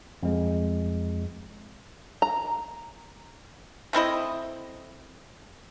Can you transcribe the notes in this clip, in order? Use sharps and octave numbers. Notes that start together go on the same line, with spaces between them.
F2 G#3
A#5
A3 C4 E4 D#5